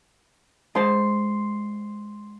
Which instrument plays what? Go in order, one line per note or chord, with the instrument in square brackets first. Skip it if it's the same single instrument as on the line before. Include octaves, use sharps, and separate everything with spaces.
[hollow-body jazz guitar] G#3 C5 A5 [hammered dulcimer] C6